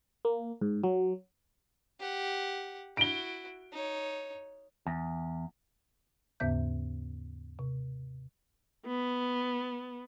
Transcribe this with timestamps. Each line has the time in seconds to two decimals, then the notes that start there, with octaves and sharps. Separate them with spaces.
0.25 A#3
0.61 G#2
0.84 F#3
2.00 G4 F#5
2.97 E4 F#4 D7 G7
3.72 D#4 C#5
4.87 E2
6.40 D#2 G#2 C#3 B3 E5 G6
7.59 C3
8.86 B3